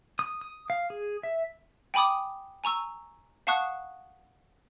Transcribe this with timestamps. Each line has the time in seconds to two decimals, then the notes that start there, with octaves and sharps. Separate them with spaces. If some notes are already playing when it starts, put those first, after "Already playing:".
0.19 D#6
0.41 D#6
0.70 F5
0.90 G#4
1.23 E5
1.94 G5 G#5 B5 D6 D#6
2.64 G#5 A#5 C#6 E6
3.47 F5 F#5 A5 C#6 D#6 F#6